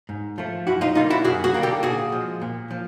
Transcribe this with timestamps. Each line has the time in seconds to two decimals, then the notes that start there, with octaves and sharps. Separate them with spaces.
0.09 G#2
0.38 F3 A3
0.67 F#2 E4 F#4
0.81 D#4 F4
0.95 D3 G3 A#3 D#4 F4
1.10 E4 F#4
1.24 F#2 F#4 G#4
1.44 F#4 G#4
1.54 D3 G3 A#3
1.63 G4 A4
1.83 A#2 F#4 G#4
2.12 F3 G#3
2.42 A#2
2.71 F3